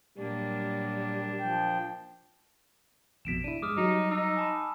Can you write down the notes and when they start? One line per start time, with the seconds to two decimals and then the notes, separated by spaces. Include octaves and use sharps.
0.18 A#2 F#3 G3 A#3 D4
1.39 F3 G5
3.25 A1 F2 B2 B6 D7 E7
3.44 D4 E4 D#7
3.62 G2 G#3 D6 D#6 F6
3.77 F#3 G3 D#4
4.11 D#4 E6
4.37 G#5 A5 B5